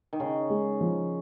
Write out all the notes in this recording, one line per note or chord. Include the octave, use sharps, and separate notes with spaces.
D#3
C#3 D#4
G#3
F3